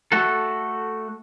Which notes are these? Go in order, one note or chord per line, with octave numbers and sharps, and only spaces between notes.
A3 F#4 A4